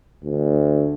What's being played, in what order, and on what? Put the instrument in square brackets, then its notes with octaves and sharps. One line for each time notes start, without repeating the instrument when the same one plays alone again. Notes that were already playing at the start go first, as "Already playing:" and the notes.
[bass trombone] D2